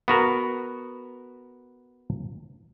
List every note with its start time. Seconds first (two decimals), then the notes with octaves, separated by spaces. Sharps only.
0.08 B3 F#4 A#4